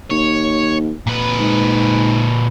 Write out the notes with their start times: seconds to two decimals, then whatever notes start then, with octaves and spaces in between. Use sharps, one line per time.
0.11 D#2 C#5
1.07 A#2 B4
1.39 G#2